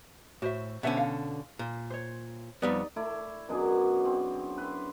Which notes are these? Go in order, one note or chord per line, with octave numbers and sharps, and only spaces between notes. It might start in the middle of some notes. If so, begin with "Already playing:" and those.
A2 F#4 C5 E5
B2 D3 C#4 C5 E5 F#5
F5
A#2
C5 C#5
F2 G3 B3 D#4 D5
A3 E4 D5
F#2 B2 D4 G#4
C4
B4 C6